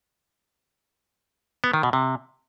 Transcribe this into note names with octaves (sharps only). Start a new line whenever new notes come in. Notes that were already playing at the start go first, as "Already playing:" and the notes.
B3
D#3
B2
C3